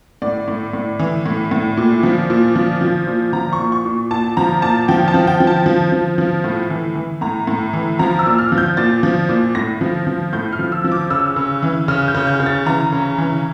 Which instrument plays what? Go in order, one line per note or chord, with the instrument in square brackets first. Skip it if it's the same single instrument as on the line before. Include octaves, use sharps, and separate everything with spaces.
[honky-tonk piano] A2 D5
A2
A2
E3
A2
A2
A#2
F3
A#2
F3
F3
A#2
F3 A#5
C#6
A#2
C#6
A#2
A#2 A5
F3 A#5
A#2 A5
F3 G5
A5
F3
G5
F3
A5
F3
F3
F3
A2
E3
E3
A2 A#5
A2
E3
F3 A#5
E6
A#2
F6
F3
G6
A#2 A6
F3
A#2
A2 A#6
F3
F3
A2 G6
F6
F3
E6
F3
D6
C#3 E6
C#3
E3
C#3 F6
G6
C#3
G6
C#3
A6
E3 A#5
C#3
E3